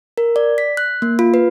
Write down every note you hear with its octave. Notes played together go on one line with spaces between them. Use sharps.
A#4
D5
B6
F#6
A#3
F4
B4